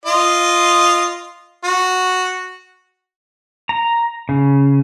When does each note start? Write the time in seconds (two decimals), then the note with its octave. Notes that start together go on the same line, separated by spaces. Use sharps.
0.06 F4 D#5 C6
1.64 F#4
3.69 A#5
4.29 C#3